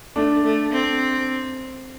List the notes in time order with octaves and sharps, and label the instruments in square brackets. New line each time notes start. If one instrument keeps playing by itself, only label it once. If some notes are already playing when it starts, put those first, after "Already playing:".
[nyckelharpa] A3 [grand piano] D4
[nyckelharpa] A3
C4